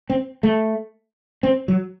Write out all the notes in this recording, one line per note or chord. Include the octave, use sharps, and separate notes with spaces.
C4
A3
C4
F#3